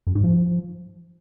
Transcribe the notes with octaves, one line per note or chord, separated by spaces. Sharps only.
F#2
G#2
F3